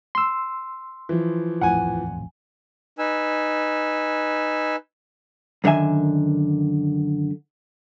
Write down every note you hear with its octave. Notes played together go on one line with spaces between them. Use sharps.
C6 E6
E3 F3
D#1 A1 F2 F#5 G#5
D#4 B4 G#5 E6
F#2 D3 D#3 E5 G#5